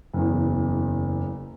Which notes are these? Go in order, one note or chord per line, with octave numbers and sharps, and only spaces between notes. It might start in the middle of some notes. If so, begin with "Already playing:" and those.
F#1 E2